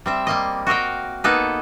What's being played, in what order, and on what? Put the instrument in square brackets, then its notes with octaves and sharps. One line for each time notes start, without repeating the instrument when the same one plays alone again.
[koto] G3 C4 E5
G3 A#3 D#5
F#4 A#4 D#5 F5 G5
A#3 B3 D#4 A4 B4